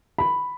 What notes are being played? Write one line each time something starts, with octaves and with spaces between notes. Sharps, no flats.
B5